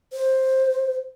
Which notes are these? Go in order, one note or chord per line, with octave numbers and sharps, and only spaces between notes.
C5